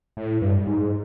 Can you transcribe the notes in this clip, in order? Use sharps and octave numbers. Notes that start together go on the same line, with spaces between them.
A2
G2
G#2